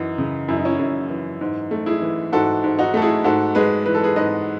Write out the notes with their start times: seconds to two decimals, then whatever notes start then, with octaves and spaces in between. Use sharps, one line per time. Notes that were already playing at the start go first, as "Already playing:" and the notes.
Already playing: F#2 E3 D#4 F#4
0.18 C#3
0.48 F#2 E4
0.57 D#4
0.65 C#4 E4
0.79 F#2
1.10 E3
1.41 G#2
1.71 A3
1.86 E4 G#4
2.02 E3
2.32 G#2 F#4 A4
2.64 G#2
2.79 D#4 F#4
2.94 A3 A4
3.02 E4 G#4
3.24 G#2 F#4 A4
3.55 G#3 G#4 B4
3.86 E3 B4
3.95 A4
4.03 G#4 B4
4.16 G#2 B4 D#5